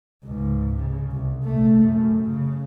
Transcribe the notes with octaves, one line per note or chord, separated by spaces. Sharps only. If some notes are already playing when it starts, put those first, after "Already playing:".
C#2 G#2
C#3
C2
A#1 A3
F#2
C#3